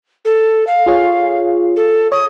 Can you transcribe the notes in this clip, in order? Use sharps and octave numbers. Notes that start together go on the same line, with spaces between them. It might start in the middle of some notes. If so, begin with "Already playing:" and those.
A4
F5
F4 G#4 C#5
A4
C#5 D#6